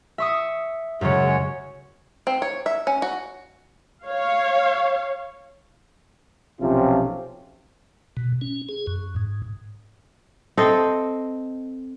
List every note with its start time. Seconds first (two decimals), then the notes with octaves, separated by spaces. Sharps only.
0.18 E5 C#6 D#6
1.01 F#2 C#3 G#3 C#5
2.27 C4
2.42 C#5
2.66 E5
2.87 C#4
3.02 F#4
4.05 C#5 F5
6.61 B1 C3 F3 C4 C#4 F4
8.17 B2
8.41 C#4
8.69 G#4
8.87 F#2
9.16 G#2
10.57 C4 A4 C5 D#5